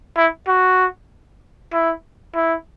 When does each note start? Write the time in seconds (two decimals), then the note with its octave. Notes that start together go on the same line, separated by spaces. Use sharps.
0.17 E4
0.48 F#4
1.73 E4
2.35 E4